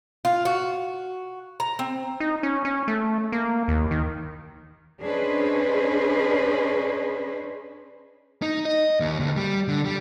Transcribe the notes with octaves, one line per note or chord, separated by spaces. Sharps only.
F4
F#4
A#5
C4
D#4
C#4
C#4
A3
A#3
D#2
D#3
C#4 D4 G#4 B4 C5 D#5
D#4
D#5
D#2
D2
G3
D3
G3